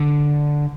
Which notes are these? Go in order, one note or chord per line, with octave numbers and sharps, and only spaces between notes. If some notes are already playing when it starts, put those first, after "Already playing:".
Already playing: D3